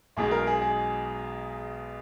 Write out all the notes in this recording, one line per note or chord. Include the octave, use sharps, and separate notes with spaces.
B1 B2 G#3 G#4
A#4
G#4
G#4